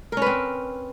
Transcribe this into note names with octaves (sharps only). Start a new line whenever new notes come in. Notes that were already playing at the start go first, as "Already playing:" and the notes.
C4 C#4 A#4 B4